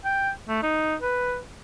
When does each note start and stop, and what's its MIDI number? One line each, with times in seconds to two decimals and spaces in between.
0.05 0.31 79
0.48 0.63 57
0.63 0.96 63
1.02 1.39 71